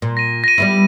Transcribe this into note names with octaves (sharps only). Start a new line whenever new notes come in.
A#2
A#6 D#7
A#6 D#7
G3 B3 E4